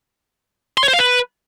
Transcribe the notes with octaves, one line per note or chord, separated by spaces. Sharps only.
C6
C#5
C5
F5
B4